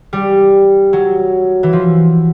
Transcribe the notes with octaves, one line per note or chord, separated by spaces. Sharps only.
G3
F#3
E3
F3